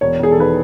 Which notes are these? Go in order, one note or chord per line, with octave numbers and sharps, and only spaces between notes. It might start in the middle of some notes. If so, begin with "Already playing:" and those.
E1 C#5
E1 G#4
A4
D#3 B4